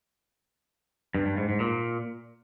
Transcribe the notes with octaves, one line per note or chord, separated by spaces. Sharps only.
G2
G2
G#2
G#2
A#2